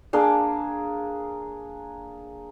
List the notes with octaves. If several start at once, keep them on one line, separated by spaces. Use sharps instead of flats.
A#3 D4 G#4